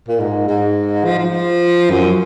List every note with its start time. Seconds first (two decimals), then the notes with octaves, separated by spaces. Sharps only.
0.08 A#2
0.20 G#2
0.48 G#2
1.05 F3
1.19 F3
1.90 F#2